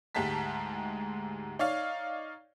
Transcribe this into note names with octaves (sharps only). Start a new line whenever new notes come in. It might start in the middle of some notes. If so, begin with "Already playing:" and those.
D2 G#2 G#3 G4 A5 B6
D#4 C#5 D5 F5